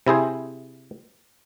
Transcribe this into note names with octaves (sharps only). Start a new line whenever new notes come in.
C3 E4 G#4 C5